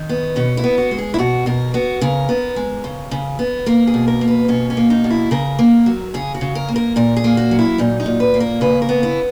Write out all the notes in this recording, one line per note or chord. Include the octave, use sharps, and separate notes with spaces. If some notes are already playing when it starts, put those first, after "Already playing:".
Already playing: D#3
B3
B2 C#4
E4
B3
F#4
G#3
G#4
E4
B2 F#4
B2 A#4
B3 F#4
C#3 A#4
B3
G#3
C#3
C#3
B3
A#3 A#4
G#4
B2
A#4
A#3
B4
B2 C#4
C#4
A#3
D#4
B2
E4
C#3 A#4
A#3
F#3
C#3 G#4
F#4
C#3
A#4
A#3
A#4
A#2 A#4
G#4
A#3
F#4
F#3
E4
A#2 D#4
D#4
A#2
B4
A#3
A#4
C#3 B4
A#4
B3
E4